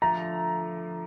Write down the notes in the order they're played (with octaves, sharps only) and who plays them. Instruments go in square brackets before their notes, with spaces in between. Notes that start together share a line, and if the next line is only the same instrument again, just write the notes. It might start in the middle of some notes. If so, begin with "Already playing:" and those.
[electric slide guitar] D3 F3 A3 [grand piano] A#5